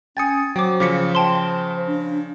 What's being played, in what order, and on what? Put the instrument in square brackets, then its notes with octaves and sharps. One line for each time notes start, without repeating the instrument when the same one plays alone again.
[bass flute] C#4 [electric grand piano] G5 G#5 D#6 [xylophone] A6 C#7
[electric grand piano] F#3 [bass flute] C5 [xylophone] G5 D6
[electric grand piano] C#3 F3 [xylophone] D6 B6 C#7
[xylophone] G5 A5 C6
[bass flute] D4